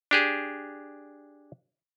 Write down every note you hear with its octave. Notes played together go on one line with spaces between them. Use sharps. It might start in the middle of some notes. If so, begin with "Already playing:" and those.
D4 G4 G#4